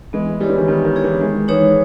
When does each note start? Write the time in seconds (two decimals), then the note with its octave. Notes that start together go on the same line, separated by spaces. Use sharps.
0.13 E3 G#3 B3
0.40 G3 E4 G#4 C#5
0.49 E3
0.58 D#3 G3
0.68 D#3 B3
0.85 D#3
0.95 E4 G#4 C#5
1.04 E3
1.21 D#3 G#3
1.48 E3 D#4 G#4 C#5